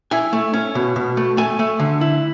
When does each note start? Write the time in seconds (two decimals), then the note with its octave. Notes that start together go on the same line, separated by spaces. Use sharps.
0.11 E4 G#5
0.33 A3
0.53 C#4
0.75 B2
0.96 B2
1.17 A3
1.37 A3 G#5
1.59 A3
1.80 D3
2.01 E4